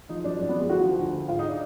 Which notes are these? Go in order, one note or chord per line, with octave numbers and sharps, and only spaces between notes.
F3 D#4
F#2 D4
F#2 D4
B3
F3
G#3
D2 F#4
F3
D2
D3
G#2 F4
D#4
D4